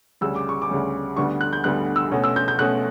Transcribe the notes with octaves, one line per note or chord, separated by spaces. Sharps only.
D2 C#3 G3 C#4 E6
D6
C#6
D6
D2 C#3 G3 C#4
D2 D3 G3 B3 D4 C#6
F#6
G6
D2 D3 G3 B3 D4 F#6
E6
B2 A3 C#4
E6
G6
G6
B2 A3 C#4 F#6